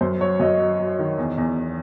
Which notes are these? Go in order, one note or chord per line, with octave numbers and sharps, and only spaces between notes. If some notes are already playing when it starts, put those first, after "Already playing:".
F#2 C5
F#3 C#5
F#2 D#5
F#3
F#3
D#3
E2
E2